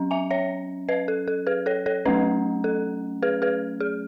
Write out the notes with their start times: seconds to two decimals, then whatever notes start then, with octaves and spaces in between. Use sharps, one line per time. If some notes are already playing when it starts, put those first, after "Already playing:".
Already playing: F#3 C#4
0.11 E5 G#5
0.30 C#5 E5
0.89 B4 D#5
1.08 A4
1.28 A4
1.47 G#4 B4
1.66 A4 C#5
1.86 A4 C#5
2.05 F#3 A3 C#4 B4 D#5
2.64 A4
3.22 G#4 B4
3.42 G#4 B4
3.80 G#4